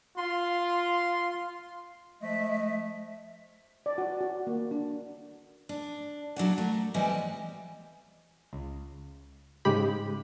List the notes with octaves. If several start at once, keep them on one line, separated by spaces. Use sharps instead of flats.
F4 C6
F3 G#3 A3 D#5 E5
D5
F#4
F#4
A#3
D4
D4
A#2 F#3 D4 F#5
A3 A#4
E3 G3 G#3 B3 C4 G4
C#2
G#2 C#3 G#3 G4 B5